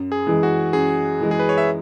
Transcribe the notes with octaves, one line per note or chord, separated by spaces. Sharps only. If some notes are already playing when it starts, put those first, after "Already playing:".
Already playing: F#2
G#4
E3 G#3
F#4
F#2 G#4
E3 G#3
G#4
B4
C#5
E5